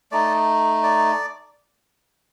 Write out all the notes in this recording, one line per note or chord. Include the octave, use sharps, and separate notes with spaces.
A3 D#4 D5
D5